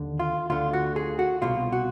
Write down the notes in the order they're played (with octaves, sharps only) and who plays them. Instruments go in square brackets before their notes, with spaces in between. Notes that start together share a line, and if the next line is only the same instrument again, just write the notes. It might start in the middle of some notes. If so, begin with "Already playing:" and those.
Already playing: [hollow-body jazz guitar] D#2 D3
F4
D2 D3 F4
F#4
G#4
F#4
C2 B2 F4
F#4